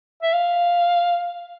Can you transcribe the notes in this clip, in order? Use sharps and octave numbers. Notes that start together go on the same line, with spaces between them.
E5
F5